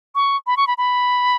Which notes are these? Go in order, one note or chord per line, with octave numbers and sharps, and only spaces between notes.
C#6
B5
C#6
B5
B5